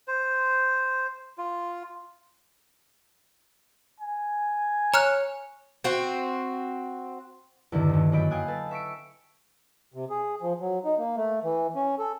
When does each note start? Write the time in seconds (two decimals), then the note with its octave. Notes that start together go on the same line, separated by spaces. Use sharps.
0.08 C5
1.38 F4
4.00 G#5
4.94 C#5 A#5 F6 F#6
5.84 C4 F#4
7.72 E2 G2 D3 D#3 D4
7.89 G1 D#2
8.12 F#2 A#3 D#5 B5 G6 D7
8.31 F5 G5 G#5 D#6 F#6
8.48 A4 B4 A5 A6
8.71 E5 C#6 B6 C#7 D7
9.94 C3
10.10 G#4
10.42 F3
10.61 F#3
10.85 D#4
10.99 A#3
11.17 A3
11.44 E3
11.76 C#4
11.99 A4